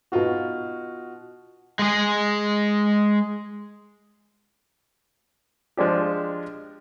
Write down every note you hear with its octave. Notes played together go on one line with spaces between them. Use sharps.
B2 D#4 F4 F#4
G#3 G#4
F3 G#3 D4 G4